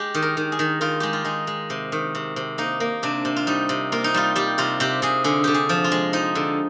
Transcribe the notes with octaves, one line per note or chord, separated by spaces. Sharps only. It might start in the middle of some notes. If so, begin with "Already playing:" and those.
Already playing: G#3 G4
D#3
A#4
D#3
G#4
D#3
D#3 F4
G#3 G4
F4
G#3 D#4
G#3
C3
D#3
C3
C3
A#3 D#4
A#3
C3 D4
C3
F4
G3 D#4
C3
A#3 F4
D#4
G3 F4
G3 G4
C3 F4
C3 G4
C3 G#4
D3 G#4
D3 G4
G#4
F3
F4
G#3
F3 D#4
D3